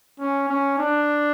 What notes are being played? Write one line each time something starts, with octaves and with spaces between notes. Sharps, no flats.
C#4
C#4
D4